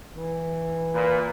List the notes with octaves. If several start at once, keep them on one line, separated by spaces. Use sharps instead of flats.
E3
A#2 B4